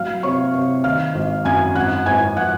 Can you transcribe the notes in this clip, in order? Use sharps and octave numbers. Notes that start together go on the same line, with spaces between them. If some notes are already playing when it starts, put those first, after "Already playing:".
Already playing: F#3 F5 F6
C3 C#5 C#6
C3
D#3 F5 F6
G#1
F#2 G#5 G#6
G#1 F#5 F#6
G#1 G#5 G#6
F3 F#5 F#6